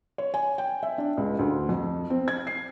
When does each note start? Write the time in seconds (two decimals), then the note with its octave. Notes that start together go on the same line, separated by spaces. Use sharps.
0.18 C#5
0.34 G#5
0.58 G5
0.83 E5
0.98 D4
1.17 C#2
1.39 D2
1.69 F2
2.10 C4
2.28 G#6
2.47 C7